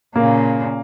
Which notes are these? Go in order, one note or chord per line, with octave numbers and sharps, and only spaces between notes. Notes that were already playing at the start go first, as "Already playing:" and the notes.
A#2 C#3 A#3